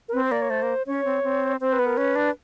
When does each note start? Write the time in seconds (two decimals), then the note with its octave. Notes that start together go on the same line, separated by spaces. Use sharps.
0.09 A#4
0.13 C4 B4
0.22 C5
0.32 A#3 D5
0.42 C#5
0.50 A3 C5
0.62 A#3
0.87 C#4 C#5
1.05 C4
1.23 C4
1.60 C4 C5
1.73 B4
1.79 B3
1.86 A#4
1.97 C#4 B4
2.16 D4